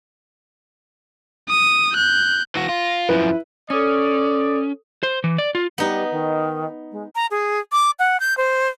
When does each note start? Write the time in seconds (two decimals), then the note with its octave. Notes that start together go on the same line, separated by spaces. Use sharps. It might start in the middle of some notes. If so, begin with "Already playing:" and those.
1.49 D#6
1.94 F#6 G6
2.55 E3 F#4 A#6
2.69 F4
3.09 F#2 F3 E4 B4
3.70 C#4 A4 D5 D#6
5.03 C5
5.24 E3
5.38 D5
5.55 F4
5.78 G3 B3 D#4
6.11 D#3
6.91 G#3
7.15 A#5
7.31 G#4
7.72 D6
7.99 F#5
8.20 G6
8.37 C5